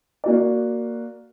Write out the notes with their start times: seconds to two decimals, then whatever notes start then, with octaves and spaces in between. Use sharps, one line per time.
0.24 A#3 F#4 D5